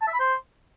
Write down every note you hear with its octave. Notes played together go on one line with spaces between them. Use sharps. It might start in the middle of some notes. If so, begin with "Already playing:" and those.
A5
E5
B5
C5